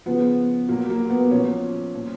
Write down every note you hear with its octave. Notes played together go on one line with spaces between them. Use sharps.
C#3 F3 B3
A#2 F#3 A#3
A#3
B3
A#2 F3 C#4
A#2 F3